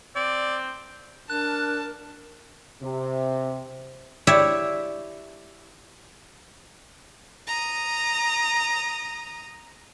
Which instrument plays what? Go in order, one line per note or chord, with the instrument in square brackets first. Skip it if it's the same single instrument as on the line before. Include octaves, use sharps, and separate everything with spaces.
[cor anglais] C4 [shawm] D5
[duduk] D4 [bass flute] A#4 [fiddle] A5 [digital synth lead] F#6
[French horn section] C3
[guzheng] E4 G4 C#5 D5 E5
[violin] A#5 D#6